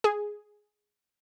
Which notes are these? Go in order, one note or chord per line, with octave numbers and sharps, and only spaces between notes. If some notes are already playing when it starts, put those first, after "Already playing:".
G#4